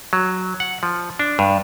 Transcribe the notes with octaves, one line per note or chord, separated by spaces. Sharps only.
F#3
F#5
F3
D4
G2